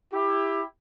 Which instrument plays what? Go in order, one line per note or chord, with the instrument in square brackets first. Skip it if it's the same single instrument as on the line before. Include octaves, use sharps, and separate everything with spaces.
[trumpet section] E4 G4